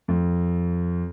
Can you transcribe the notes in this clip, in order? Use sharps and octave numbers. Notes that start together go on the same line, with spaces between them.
F2